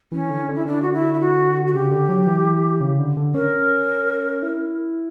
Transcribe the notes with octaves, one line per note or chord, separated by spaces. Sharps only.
E3 C#4
D3
D3
E4
D3 D4
F#4
E4
E4
F#4
F#4
C#3 G4
D3
F#3
E3
C#3
D3
D3
C#4 A#4
E4